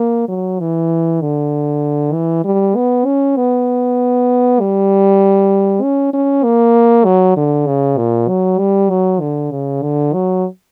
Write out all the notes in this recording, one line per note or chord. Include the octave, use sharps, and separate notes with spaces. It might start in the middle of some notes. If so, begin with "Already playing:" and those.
Already playing: A#3
F#3
E3
D3
E3
G3
B3
C#4
B3
G3
C#4
C#4
A#3
F#3
D3
C#3
A#2
F#3
G3
F#3
D3
C#3
D3
F#3